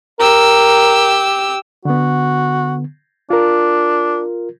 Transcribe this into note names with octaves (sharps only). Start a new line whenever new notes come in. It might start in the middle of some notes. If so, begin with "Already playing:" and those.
G4 A#4 E6
D3 B3 F#4
D4 F4 A#4